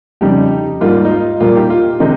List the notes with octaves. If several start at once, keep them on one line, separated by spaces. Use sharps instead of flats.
F2 C#3 G3 D#4 G4
G#2 G3 A#3 F4
D#4
F4
A#2 G3 A#3 F4
D#4 G4
F4
C3 D#3 G#3 D#4